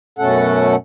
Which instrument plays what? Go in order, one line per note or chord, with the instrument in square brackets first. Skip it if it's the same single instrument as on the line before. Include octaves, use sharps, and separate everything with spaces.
[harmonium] F#2 B2 A3 C#4 A4 F#5